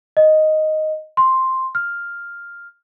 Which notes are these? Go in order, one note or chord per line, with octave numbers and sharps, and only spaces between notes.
D#5
C6
F6